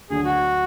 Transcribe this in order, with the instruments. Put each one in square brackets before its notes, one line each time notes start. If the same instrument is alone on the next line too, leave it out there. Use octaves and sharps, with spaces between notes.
[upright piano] D2 D3 F#3 D4 [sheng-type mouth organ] G#4
[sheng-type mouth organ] F#4